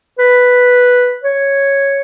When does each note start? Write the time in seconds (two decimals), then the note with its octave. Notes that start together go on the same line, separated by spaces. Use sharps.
0.19 B4
1.23 C#5